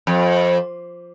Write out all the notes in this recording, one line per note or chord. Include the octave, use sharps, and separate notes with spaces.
F2